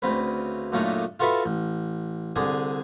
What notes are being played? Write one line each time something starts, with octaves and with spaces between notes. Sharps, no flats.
D2 C#3 C4 B4
F#2 A#2 C#3 A3 D4 D#4
F4 F#4 A4 B4 E5 B5
A1
C2 D3 D4 G#4 G#5